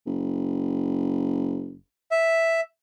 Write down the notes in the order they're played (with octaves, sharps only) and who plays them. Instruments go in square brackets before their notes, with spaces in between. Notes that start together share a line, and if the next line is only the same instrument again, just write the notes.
[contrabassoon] F#1
[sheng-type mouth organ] E5